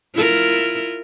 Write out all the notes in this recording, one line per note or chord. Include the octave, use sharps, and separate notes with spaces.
E4 F4 A#4